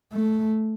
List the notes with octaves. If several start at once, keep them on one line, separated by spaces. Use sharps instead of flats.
A3